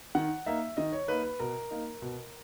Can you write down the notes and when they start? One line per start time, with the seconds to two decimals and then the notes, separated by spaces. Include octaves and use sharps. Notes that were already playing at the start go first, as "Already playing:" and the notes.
0.15 D#3 F#5
0.46 A#3 D#4 E5
0.77 D#3 D#5
0.92 C#5
1.08 A#3 D#4 B4
1.24 B4
1.40 B2 A#4
1.71 A#3 D#4
2.02 B2